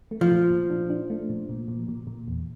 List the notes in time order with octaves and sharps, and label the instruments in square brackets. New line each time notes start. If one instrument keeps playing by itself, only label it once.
[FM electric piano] A3
[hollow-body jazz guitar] F3
[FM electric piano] A#2
A#2
D4
D4
A3
A#2
A#2
A#2
A#2
A#2
E2